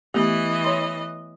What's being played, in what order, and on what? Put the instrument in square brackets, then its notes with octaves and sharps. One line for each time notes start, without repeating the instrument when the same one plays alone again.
[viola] E3 D#5 [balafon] A3 B3 G4
[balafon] C#5 C6